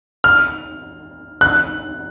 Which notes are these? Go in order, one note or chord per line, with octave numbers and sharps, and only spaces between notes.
F6
F#6